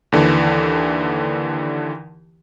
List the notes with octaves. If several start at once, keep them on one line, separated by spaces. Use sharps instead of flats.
D#2 D3 E3